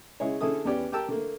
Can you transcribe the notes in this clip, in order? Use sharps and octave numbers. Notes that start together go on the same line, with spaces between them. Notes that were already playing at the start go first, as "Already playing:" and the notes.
C#3 G#3 E4 G#4 C#5
D3 C#4 E4 G#4 A4 D#6
E2 B3 C#4 G4 D5 G5
G4 A#4 G5 A5 E6
D3 A3 A#3